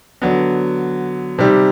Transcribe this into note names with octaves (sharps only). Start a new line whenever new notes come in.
D3 F#3 B3
C3 D#3 G3